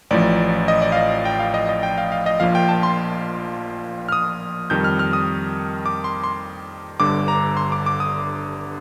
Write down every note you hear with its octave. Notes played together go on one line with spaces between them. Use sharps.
A1 A2 F3 D5
D#5
D5
F5
D#5
G5
F5
D#5
D#5
G5
F5
F5
D#5
A#1 A#2 F3 F5
G5
A5
C6
F6
D#6
F2 D#3 G3 G6
F6
F6
D#6
D6
C6
C6
G1 G2 D3 D6
A#5
C6
D6
D6
D#6